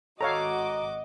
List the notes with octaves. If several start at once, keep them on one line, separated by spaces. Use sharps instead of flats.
G#1 F#4 A4 C#5 D#5 F5 A#5 D6